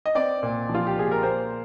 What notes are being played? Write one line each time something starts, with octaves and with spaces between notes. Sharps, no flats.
D#5
C4 D5
A#2
F3
F4
G4
A#2 G#4
A#4
A#3 C5